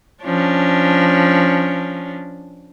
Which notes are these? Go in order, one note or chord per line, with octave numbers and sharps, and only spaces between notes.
F3 C#4 D4